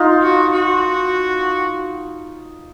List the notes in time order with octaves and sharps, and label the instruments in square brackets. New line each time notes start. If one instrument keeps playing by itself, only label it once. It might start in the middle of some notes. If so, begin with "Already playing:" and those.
Already playing: [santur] D#4 F4
[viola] F#4
F#4